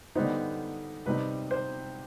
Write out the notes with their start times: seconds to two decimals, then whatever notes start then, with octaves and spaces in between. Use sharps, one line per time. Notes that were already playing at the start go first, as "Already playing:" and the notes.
0.15 D3 G3 B3 D#4 C5
1.06 C3 G3 C4 D#4 B4
1.51 C5